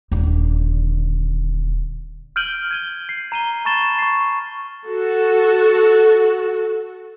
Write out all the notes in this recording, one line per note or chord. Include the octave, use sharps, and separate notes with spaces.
D#1 D3
F6 G6 D7 D#7 F#7 G7
G#6 D#7 G7
C7
A#5 D#7 G7
A5 B5 C#6 A6 E7 G7
C#6 C7
F#4 A4